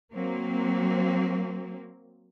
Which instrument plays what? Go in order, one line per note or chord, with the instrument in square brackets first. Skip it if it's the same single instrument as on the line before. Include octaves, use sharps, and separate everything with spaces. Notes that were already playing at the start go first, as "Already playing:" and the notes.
[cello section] F#3 A#3 C4